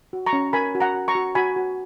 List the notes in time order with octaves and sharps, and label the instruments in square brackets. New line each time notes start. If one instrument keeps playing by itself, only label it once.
[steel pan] F#4
A#5 C#6
C#4
A#4 G#5 B5
F#4
F#5 A#5
F#4
A#5 C#6
F#4
F#4 G#5 B5
F#4